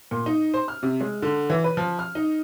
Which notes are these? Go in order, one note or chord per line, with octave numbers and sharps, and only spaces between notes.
A#2
D#4
C5
F6
C3
G#3
D3
E3
B4
F3
F6
D#4